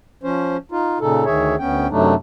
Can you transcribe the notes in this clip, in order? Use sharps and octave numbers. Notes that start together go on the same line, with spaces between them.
F3 C#4 C5
D#4 F4
A#2 C#3 D#4 A4
D2 D#3 G#4 C#5 E5
D2 B3 C#4 G5
F#2 C3 F#3 A3 D4 D#4